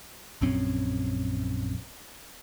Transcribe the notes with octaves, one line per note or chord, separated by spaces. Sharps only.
A#1 F#2 C4 C#4